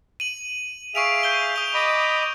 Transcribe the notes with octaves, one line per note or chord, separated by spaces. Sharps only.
D#7 F#7
G#4 E5 F5 C#6 D7 F7
G6 G7
D#6 F7
D#5 B5 D6